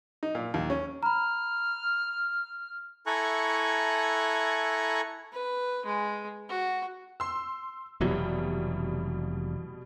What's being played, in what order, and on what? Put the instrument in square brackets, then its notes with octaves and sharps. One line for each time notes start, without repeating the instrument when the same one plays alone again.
[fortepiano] D#4
A#2
D#2
C#4
[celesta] A#5 B5 [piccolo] F6
[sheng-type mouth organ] E4 A4 G#5 A#5 C#6 F#6
[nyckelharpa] B4
G#3
F#4
[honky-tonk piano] C6 E6
[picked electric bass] F1 E3 F#3 [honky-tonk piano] B2 G3